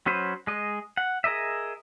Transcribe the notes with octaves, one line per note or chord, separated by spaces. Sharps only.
F#3 C#4 B4 C5
G#3 D#5
F#5
G#4 A#4 D#5 E5